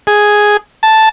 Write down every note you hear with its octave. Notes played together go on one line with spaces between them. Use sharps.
G#4
A5